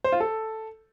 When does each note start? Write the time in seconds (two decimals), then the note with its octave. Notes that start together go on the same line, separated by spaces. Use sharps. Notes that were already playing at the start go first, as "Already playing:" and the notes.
0.04 C5
0.12 F4
0.20 A4